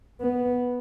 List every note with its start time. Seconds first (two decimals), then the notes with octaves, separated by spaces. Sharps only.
0.21 B3